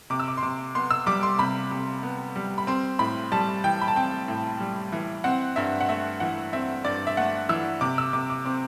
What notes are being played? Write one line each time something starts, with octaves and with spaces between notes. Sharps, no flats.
C3 D6
E6
D6
C6
C3 D6
B3 C6
E6
G3 D6
C6
C3 B5
C3
B3
G3
B5
C4 C6
A2 B5
G3 A5
E3 G5
B5
A5
C4 G5
A2
G3
E3
C4 F#5
G2 E5
F#5
A3 E5
E3 F#5
C4 E5
G2 D5
E5
A3 F#5
E3 E6
C3 D6
E6
C3 D6
D6
C4 D6